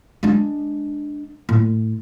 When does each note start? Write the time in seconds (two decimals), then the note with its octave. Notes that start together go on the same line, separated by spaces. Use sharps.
0.23 G#3 D4
1.49 A2